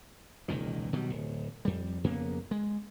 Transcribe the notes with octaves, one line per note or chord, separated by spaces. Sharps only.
E1 C#2 A#2 D#3
B2 D#3 F#3 G3
D1
F2 G3
F2 C#3 A#3 B3
G#3